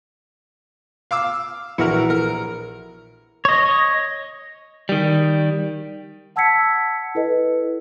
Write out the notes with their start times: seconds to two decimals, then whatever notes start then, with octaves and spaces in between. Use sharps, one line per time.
1.11 F5 D6 E6
1.78 A#1 E3 E4 F#4 A#4 C#7
2.10 A#4
3.45 C#5 D#5
4.89 D#3 G3
6.36 F#5 A5 E6 G#6 B6 C#7
7.15 E4 A4 B4 D#5